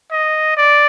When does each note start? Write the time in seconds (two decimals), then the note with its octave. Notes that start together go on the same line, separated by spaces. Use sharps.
0.11 D#5
0.57 D5